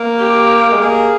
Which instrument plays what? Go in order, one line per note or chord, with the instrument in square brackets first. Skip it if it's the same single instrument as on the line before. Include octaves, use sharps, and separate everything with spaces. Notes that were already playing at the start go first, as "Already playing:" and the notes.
Already playing: [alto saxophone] A#3
[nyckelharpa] G4
[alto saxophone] G#3
[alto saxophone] A#3 [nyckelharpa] G#4